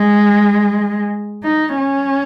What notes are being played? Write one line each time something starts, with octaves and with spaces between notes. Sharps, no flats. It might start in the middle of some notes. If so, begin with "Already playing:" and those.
Already playing: G#3
D#4
C#4